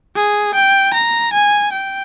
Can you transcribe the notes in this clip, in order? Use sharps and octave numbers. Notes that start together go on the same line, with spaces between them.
G#4
G5
A#5
G#5
G5